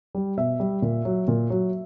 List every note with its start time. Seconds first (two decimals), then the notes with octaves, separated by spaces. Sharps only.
0.15 G3
0.37 B2 E5
0.60 G3
0.82 A#2
1.05 F#3
1.28 A#2
1.50 F#3